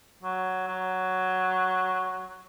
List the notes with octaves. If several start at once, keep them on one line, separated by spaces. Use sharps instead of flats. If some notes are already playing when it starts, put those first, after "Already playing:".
F#3
F#3